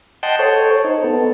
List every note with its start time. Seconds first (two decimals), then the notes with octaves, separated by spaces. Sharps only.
0.23 D#5 F#5 G5 A5 C6
0.39 A4 C5 C#5
0.84 D#4
1.04 B3 A4